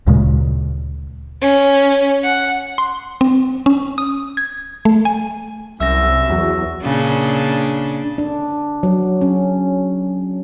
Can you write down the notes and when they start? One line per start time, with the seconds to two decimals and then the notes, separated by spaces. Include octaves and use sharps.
0.07 D2 A#2 C#3 G#3
1.42 C#4
2.23 F#5
2.78 C6
3.21 C4
3.66 C#4
3.98 D#6
4.37 G#6
4.85 A3
5.05 G#5
5.80 C2 F#2 E5 E6 A#6
6.30 E2 F#3 F#4
6.83 A#2 C#3 D4
8.18 D4
8.83 F#3
9.21 C#4